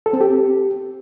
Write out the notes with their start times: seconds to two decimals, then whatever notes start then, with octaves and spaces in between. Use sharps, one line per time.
0.06 A4
0.13 C4
0.21 G4